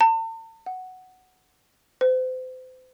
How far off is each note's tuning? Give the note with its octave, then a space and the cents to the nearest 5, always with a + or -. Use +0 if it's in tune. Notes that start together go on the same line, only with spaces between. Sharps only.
A5 +45
F#5 +5
C5 -35